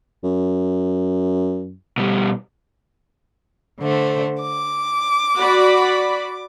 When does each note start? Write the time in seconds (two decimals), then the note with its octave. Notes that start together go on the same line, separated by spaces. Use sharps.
0.23 F#2
1.98 B2 G3
3.79 D3 A3 C5
4.41 D6
5.39 F#4 D5 B5